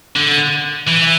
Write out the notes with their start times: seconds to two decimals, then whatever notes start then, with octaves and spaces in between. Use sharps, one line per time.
0.16 D3
0.87 E3